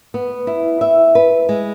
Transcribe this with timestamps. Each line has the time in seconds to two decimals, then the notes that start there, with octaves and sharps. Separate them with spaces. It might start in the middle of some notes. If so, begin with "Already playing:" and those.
0.14 B3
0.47 E4
0.81 E5
1.15 B4
1.49 G#3